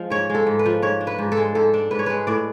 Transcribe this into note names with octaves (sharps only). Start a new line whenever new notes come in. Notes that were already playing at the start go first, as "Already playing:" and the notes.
Already playing: F3 G#3
G#2 C#5
G#3
A4
G#2
B4
F3
G#2 C#5
D4
B4
G#2
A4
G#3
G#2 A4
D4
G#2 B4
C#5
G#3 B4
A2 D5